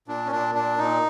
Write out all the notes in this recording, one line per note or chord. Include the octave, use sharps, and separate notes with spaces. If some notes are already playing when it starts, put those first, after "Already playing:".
A#2 D4
C#4
A#2 D4
A#2 D4
A#2 D#4